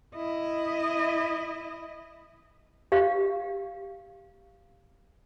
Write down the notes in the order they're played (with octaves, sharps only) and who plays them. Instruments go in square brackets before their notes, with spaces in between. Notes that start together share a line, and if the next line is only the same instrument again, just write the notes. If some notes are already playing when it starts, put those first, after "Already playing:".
[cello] E4 D#5
[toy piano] G4 F5